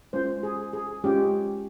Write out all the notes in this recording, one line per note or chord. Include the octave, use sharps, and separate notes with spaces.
G#3 C#4 F4 C5
G#4
G#4
G#3 C#4 F4 G4